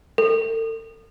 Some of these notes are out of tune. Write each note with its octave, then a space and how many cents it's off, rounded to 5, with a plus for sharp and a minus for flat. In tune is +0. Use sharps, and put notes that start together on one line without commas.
A4 +40